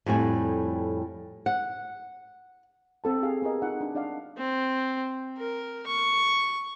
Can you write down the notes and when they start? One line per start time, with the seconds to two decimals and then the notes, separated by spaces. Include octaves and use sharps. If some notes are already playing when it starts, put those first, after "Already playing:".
0.06 F2 A2 G3 G#5
1.46 F#5
3.04 C4 A4 A5
3.22 G4 G#4 F5
3.42 B3 G#4 A#4 D#5
3.62 D#4 F4 F#5
3.81 D4
3.95 D4 D5 D#5 F5 F#5
4.37 C4
5.38 A#4
5.87 C#6